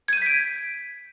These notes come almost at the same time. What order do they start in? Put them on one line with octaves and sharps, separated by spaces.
G#6 D#7 G6 B6 D7